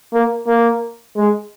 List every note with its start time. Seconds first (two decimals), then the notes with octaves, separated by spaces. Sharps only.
0.13 A#3
0.47 A#3
1.16 G#3